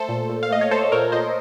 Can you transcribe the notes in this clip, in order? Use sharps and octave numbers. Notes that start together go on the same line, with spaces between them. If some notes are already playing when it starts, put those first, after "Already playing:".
Already playing: A3 A4 C5
A#2
A#2
F5
A3 D#5
C#5
A3 A4 C5
A#2 A#4 C#5
A#2 C5 D#5